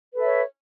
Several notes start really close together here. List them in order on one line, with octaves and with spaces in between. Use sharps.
B4 A4 E5 C#5